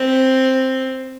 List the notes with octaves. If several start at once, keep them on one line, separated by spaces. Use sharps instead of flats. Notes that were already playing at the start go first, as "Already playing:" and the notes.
Already playing: C4